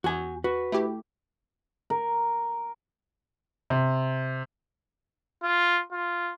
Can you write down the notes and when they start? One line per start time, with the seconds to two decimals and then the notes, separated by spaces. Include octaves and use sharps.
0.04 E2 F#4 G#5
0.44 F#4 B4
0.72 A3 E4 G4
1.90 A#4
3.70 C3
5.43 F4
5.92 F4